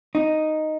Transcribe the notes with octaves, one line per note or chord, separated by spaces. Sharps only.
D#4